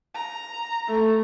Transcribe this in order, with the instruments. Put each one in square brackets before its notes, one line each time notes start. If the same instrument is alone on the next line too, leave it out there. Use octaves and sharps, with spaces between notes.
[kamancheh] A#5
[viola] A3